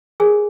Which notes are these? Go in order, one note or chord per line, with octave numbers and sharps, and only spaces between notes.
G4 G#4 A#4 C#5 G#5